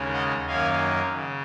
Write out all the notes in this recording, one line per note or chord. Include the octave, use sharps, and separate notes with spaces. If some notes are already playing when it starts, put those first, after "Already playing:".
Already playing: D#2 C#3 G#3 C#4
D#5 F#5
F#2 D#3 A#3 C#4 F5 G#5
C#3